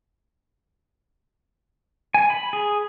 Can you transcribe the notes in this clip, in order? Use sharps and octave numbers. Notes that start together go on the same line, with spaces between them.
G#5
B5
G#4